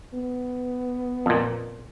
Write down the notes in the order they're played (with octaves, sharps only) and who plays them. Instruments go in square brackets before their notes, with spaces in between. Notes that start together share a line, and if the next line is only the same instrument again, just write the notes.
[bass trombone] B3
[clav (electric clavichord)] F2 A#2